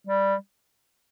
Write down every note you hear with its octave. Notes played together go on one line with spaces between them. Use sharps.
G3